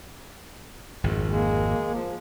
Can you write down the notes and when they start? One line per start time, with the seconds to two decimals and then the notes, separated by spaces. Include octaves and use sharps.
1.04 G#1 F2
1.27 G#3 A#3
1.94 F3